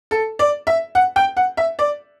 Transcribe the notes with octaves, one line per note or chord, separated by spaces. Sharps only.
A4
D5
E5
F#5
G5
F#5
E5
D5